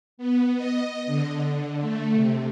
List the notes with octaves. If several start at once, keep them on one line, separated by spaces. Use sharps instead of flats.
B3
D#5
D3
A3
C3